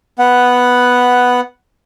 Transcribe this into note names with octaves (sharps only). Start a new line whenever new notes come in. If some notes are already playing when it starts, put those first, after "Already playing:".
B3 F#5